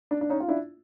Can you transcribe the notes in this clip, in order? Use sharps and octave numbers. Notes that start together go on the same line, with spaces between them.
D4
D4
C#4 D#4
F4
D4 E4